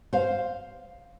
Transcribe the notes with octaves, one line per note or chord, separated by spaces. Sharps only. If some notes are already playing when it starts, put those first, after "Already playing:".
C5 F5